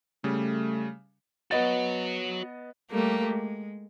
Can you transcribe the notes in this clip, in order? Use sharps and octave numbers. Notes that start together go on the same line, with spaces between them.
C#3 G3 A3
B3 F#4 C#5 D#5 A6
G3 A3 A#3 G4
G#3